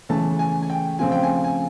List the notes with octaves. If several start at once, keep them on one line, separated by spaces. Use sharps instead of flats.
C#3 E3 A3 C#4 A5
G#5
G#5
G5
C#3 F3 A3 C4 F4 G#5
G5
G#5
G#5